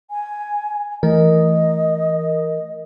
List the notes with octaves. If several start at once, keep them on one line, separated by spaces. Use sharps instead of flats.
G#5
E3 A3 A#4 D#5